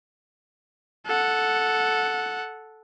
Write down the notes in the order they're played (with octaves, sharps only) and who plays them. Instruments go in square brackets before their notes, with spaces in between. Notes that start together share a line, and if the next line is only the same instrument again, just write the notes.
[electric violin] A4 F#5